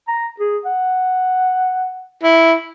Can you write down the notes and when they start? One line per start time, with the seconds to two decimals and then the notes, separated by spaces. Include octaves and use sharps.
0.08 A#5
0.40 G#4
0.65 F#5
2.23 E4